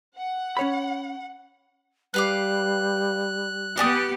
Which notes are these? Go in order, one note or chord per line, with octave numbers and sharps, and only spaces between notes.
F#5
C#4 C#5 B5
G3 B4 F5 D6 F#6
B3 G4 D5 G#5 D#6